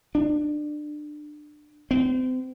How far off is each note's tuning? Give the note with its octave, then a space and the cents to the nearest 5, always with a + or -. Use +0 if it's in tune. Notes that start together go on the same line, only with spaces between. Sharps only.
D4 +25
C4 -35